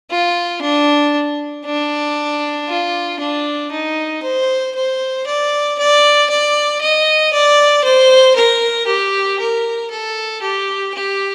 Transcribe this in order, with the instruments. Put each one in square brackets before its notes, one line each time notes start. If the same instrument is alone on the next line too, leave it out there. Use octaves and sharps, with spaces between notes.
[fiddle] F4
D4
D4
F4
D4
D#4
C5
C5
D5
D5
D5
D#5
D5
C5
A#4
G4
A#4
A4
G4
G4